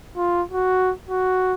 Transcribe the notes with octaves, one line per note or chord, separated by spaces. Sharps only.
F4
F#4
F#4